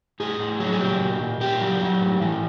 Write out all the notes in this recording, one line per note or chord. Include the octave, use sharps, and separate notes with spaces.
A2 G#4
A2
F#3
G#4
A#2 G4
A#2
A#2
A#2 G4
F#3
F#3
A2
E3